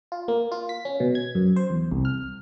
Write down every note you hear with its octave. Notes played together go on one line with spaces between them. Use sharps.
F4
A#3
F4
B6
C#4
B2
G#6
F#2
C5
E2
C2
F6